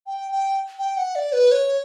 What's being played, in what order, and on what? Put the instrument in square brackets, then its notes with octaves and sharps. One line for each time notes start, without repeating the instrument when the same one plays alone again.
[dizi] G5
G5
G5
F#5
D5
B4
C#5